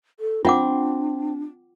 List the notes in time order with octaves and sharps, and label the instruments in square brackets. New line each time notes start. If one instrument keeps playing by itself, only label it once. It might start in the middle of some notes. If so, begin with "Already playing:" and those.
[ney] A4
[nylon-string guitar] C4 [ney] D4 [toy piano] F4 F#5 D6